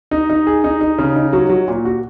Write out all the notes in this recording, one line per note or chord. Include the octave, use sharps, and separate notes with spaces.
D#4
D#4
G#4
D#4
D#4
C#3
D#4
F#3
F#3
A#2
F#4